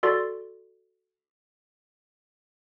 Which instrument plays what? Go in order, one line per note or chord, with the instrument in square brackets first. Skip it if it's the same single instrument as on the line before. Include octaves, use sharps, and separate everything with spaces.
[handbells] F#4 A4 D5 C6 A6